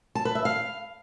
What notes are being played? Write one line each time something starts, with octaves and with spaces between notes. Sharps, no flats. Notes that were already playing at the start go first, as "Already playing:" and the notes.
A5
B4
E5
F5